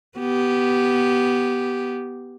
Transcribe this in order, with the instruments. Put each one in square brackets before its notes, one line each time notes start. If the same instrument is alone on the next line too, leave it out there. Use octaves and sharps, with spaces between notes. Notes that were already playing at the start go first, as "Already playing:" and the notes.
[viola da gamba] B3 G4